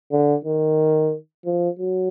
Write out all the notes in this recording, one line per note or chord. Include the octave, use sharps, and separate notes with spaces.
D3
D#3
F3
F#3